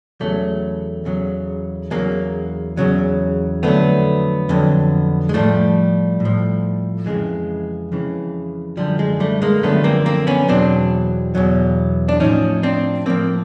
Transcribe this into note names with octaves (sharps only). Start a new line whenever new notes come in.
E2 C#3 F#3 G3 A3
E2 C#3 F#3
E2 C#3 F#3 G#3 A#3
E2 C#3 F#3
F2 D3 F#3 A3 B3
F2 D3 F#3
G#3
A2 F3 G3 A3
A2
F3
F2 C#3 E3 G#3
F2 C#3 E3
F#2 D3 F3 G3
G#3
G3 A3
G#3 A#3
F#2 D3 F3 A3 B3
A#3 C4
A#3 C4
B3 C#4
E2 B2 F#3 C4 D4
E2 B2 F#3
D4
A2 F3 C#4 D#4
C4 D4
A2 F3 A#3 C4